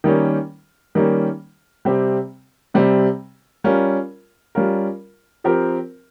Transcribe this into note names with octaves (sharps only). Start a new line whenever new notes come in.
D#3 G3 A#3 C#4
D#3 G3 A#3 C#4
C3 G3 C4 G4
C3 G3 C4 G4
G3 C#4 F4 A#4
G3 C#4 F4 A#4
F3 C4 G4 A#4